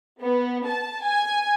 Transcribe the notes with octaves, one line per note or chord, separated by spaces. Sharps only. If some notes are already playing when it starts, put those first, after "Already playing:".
B3
A5
G#5